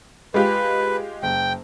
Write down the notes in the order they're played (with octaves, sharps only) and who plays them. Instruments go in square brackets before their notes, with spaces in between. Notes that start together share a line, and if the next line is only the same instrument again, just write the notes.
[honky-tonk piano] G#3 F4 G4 [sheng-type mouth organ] B4
[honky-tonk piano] F#1 [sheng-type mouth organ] G5